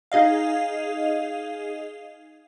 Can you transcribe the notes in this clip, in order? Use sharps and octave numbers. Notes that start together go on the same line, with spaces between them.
D#4 G#4 D#5 F5